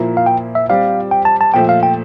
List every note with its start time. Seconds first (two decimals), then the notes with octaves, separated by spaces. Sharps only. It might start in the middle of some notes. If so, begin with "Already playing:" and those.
Already playing: A#2 F3 A#3 E4
0.17 F5
0.26 G5
0.55 E5
0.69 G3 C4 G4 D5 F5
1.11 G5
1.25 A5
1.41 A5
1.54 A#2 F3 A3 G5
1.69 F5
1.83 G5